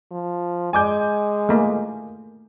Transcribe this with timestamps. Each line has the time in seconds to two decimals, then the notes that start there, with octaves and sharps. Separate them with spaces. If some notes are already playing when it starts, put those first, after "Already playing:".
0.11 F3
0.73 G#3 G#5 D6 G6
1.49 A3 A#3